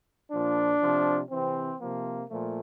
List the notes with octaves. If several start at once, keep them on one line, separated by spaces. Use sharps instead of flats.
A#2 F3 D4
C3 F3
C3 E3 C4
C3 F3 A#3
A#2 F3 A3